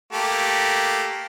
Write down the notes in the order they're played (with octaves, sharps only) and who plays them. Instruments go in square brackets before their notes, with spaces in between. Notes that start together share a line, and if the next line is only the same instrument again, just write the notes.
[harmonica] A3 A#3 G4